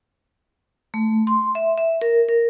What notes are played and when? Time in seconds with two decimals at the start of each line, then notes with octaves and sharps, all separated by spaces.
0.94 A3
1.27 C6
1.55 E5
1.78 E5
2.02 A#4
2.29 A#4